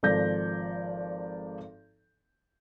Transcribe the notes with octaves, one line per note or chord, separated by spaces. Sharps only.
G#1 F3 A4 D5 G6 A#6